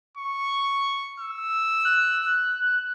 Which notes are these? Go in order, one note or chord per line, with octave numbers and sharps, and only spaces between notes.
C#6
E6
F#6